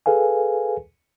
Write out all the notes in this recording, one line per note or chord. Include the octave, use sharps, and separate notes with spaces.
G#4 A4 B4 F5 G#5